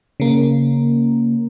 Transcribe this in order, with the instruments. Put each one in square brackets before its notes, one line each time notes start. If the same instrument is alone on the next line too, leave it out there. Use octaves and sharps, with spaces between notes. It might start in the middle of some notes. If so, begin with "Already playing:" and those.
[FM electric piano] C#3 A#3